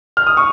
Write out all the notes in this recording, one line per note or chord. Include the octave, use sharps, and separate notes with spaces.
F6
D#6
C#6